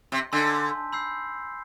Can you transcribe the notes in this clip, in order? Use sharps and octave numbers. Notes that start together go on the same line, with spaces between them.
C3
D3 G#5 C6 E6 G6 B6
B5 E6 G6 C7